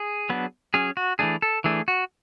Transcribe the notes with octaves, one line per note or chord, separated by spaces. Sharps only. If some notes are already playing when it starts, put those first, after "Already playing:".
Already playing: G#4
F#3 B3 D4
F#3 C#4 G#4
F#4
E3 A3 D4 G#4
A4
E3 A3 D4 G#4
F#4